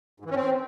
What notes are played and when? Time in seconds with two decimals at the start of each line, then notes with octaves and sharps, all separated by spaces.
0.20 G#2
0.25 E3
0.30 C#4
0.35 C4